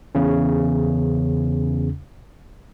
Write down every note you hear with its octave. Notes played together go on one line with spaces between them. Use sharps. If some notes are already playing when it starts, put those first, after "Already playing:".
E2 C#3 C#4